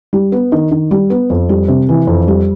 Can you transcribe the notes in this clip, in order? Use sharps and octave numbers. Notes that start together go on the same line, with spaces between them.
G3
B3
D#3
D#3
G3
B3
F2
G3
C3
E3
F2
G3